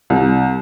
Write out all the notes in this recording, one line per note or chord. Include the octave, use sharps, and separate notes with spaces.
C2